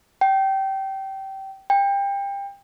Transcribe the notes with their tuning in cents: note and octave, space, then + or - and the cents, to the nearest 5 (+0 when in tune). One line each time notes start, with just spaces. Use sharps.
G5 -20
G5 +25